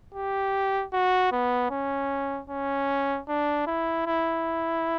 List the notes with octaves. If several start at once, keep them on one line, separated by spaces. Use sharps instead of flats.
G4
F#4
B3
C#4
C#4
D4
E4
E4